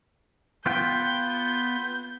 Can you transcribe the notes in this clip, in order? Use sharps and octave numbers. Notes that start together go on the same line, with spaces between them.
B3 F4 G5 G6